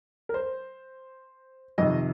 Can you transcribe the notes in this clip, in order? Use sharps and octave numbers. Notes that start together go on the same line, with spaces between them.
A#4
C5
F2 C3 D#3 D#5